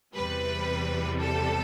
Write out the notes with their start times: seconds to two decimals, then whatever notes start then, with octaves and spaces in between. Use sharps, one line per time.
0.15 E2 C3 E3 G3 B4
1.21 A4